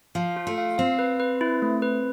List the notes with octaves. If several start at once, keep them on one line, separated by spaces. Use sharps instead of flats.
F3 F5
F4
A3
F5
C4 F5
B4
B4
E4
A3
B4